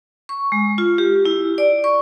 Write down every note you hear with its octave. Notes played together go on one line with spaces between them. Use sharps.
C#6
G#3
F4
G4
E4
D5
C#6